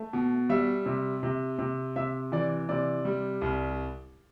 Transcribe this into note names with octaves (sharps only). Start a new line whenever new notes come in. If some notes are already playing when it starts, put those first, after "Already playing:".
Already playing: A3
B2
G3 E5
C3
C3
C3
C3 E5
E3 D5
C3 D5
G3
C2